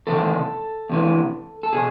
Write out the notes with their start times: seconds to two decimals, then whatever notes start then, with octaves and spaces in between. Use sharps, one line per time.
0.07 E2 C3 D#3 A4
0.90 E2 C3 E3
1.63 A4
1.73 B2 G#4